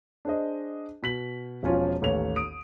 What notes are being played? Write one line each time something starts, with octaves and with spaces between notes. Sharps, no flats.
D4 G#4 C5 D#5
B2 B6 F#7
E1 F3 C#4 F4
A1 D#2 A4 C#5 F7
D#6 D7